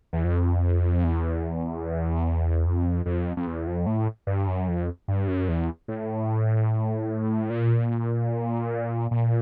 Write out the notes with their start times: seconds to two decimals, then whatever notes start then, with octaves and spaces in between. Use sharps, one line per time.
0.13 E2
0.24 F2
1.04 E2
2.66 F2
3.06 F2
3.37 F2
3.47 E2
3.67 F2
3.86 A2
4.27 G2
4.47 F#2
4.68 F2
5.08 G2
5.28 F#2
5.48 E2
5.88 A2
7.50 A#2
9.11 A#2